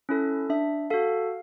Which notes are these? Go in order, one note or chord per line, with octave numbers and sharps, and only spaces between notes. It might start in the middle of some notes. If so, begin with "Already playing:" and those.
C#4 E4 A4
D4 E5
F#4 A4 F5